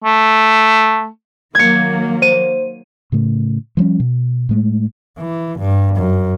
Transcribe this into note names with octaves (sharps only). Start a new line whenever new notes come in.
A3
D#3 F#3 A#3 G#6 C#7
C5 D#7
A2 C#3 A3
F3 G3 A3 C#4
B2
A2 G#3 A3
E3
G2
F#2